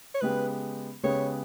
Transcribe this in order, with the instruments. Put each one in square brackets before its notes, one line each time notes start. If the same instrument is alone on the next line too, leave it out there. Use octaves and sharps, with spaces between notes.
[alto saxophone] C#5
[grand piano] C#3 G#3 B3 G4 [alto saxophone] B4
[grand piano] C#3 G#3 B3 G4 [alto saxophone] C#5